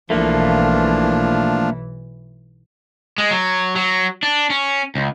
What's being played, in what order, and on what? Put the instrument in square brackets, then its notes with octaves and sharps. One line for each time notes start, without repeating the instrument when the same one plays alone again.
[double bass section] B1 E3 [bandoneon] F3 D4 F4 [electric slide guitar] A3 A#3
[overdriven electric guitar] G#3
F#3
F#3
D4
C#4
C#2